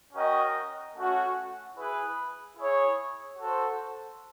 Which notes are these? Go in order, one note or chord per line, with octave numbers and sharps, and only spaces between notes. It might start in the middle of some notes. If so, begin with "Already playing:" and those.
C#4 F#4 A#4 D#5 G5
A3 C#4 F#4
E4 G#4 B4
E4 G#4 C#5
F#4 A4 C5